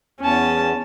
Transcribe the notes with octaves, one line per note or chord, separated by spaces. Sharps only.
E2 C#4 A5